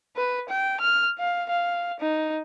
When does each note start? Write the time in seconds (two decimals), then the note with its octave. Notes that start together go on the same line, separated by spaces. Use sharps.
0.16 B4
0.49 G5
0.81 F6
1.19 F5
1.50 F5
2.00 D#4